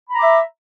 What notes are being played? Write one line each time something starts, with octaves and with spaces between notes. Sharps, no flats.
E5 A#5 B5 D6